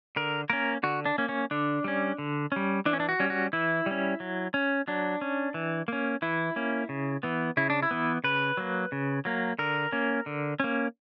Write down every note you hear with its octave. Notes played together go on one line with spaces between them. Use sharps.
D3 A#4
A#3 C#4 A#4
D3 F#4
D4
A#3 C#4
C#4
D3 D4
G3 C#4
D3
G3 C#4
E3 D4
C#4
D4
F#4
G3 C#4
F#4
E3 E4
G3 C#4
F#3
C#4
F#3 D4
C#4
E3
A#3 C#4
E3 E4
A#3 C#4
C#3
E3 B3
C#3 E4
D4
E4
E3 B3
C#3 B4
F#3 A#3
C#3
F#3 A#3
D3 A#4
A#3 C#4
D3
A#3 C#4